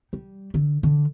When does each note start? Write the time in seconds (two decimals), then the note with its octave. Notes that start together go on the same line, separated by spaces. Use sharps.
0.13 G3
0.54 D3
0.83 D3